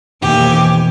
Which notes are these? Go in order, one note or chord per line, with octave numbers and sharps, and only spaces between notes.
F1 D#2 B2 E3 G4 G#5